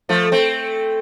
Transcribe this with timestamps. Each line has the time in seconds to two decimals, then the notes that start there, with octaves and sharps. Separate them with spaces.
0.09 F3 A3
0.32 A3 C4